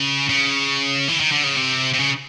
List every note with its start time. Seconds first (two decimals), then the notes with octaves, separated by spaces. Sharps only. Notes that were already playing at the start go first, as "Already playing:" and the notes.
Already playing: C#3
0.29 C#3
1.08 E3
1.20 D#3
1.32 D3
1.44 C#3
1.57 C3
1.94 C3
1.99 C#3